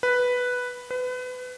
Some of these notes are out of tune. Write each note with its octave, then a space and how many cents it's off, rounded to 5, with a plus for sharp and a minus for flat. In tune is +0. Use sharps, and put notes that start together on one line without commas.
B4 +0
B4 +30